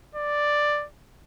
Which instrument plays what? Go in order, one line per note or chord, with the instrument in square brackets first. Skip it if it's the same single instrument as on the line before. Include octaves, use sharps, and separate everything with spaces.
[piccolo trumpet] D5